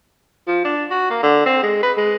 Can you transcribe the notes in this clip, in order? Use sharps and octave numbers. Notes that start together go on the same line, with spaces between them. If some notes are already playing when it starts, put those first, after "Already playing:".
F3
D4
F#4
A#3
D3
C4
G#3
B4
G#3